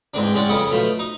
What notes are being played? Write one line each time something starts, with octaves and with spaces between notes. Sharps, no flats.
E2 G#2 C4 D4
G#3 C4 C#4 D5 F#5
F2 C#3 B3 D#5 F#5
B2 F3 A3
D#4